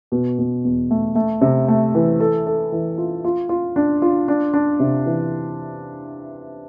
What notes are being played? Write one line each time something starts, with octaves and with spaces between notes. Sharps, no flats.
B2
B2
E2
A3
A3
C3
A3
E3
A4
A4
E3
F4
F4
F4
D4
F4
D4
D4
C3
E3